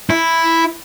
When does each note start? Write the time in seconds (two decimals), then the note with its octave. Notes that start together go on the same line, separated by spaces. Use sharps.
0.10 E4